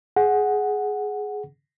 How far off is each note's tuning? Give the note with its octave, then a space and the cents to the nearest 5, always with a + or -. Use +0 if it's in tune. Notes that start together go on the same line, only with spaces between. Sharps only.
G#4 +10 F#5 +0